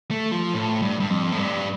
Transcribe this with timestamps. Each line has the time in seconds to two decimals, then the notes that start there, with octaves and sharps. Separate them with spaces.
0.11 A3
0.32 F3
0.54 A2
0.82 G2
1.00 G2
1.10 F2
1.32 A2
1.38 G2